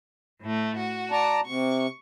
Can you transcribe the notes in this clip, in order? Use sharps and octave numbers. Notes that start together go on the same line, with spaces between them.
A2 A3
F#4
D5 A5 A#5
C3 C#6